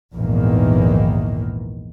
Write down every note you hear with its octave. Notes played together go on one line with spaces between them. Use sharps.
A#1 E2 G#2 D#3 E3 A#3